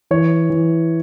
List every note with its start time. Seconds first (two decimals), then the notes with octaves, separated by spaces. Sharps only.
0.11 E3 C#5
0.50 E3